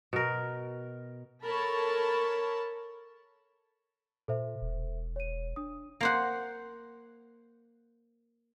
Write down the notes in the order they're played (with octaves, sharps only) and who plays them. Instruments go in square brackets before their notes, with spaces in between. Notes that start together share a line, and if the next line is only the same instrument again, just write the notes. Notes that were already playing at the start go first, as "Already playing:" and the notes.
[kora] B2 A#4
[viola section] A4 A#4 C#5 A5 B5
[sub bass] A#2 [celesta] A4 C5 E5
[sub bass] E1
[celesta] C#5 D#7
D4 D#6
[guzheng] A#3 C5 F#5